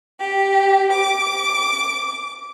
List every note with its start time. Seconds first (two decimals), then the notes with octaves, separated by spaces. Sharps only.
0.20 G4
0.91 D6